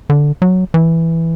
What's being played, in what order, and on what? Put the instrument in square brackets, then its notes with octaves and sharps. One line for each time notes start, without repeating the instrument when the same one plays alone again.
[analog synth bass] D3
F#3
E3